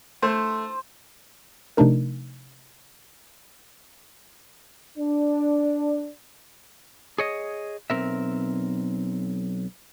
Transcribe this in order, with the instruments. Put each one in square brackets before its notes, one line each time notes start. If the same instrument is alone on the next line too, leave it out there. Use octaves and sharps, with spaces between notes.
[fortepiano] A3 [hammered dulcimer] C5
[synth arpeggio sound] C3 F3 A3 D4 D#4 A#4
[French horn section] D4
[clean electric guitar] G#4 C#5 D#5
B1 G#2 C4 A#4 E5